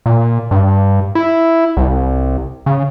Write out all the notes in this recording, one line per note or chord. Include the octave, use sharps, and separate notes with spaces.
A#2
G2
E4
C2
C#3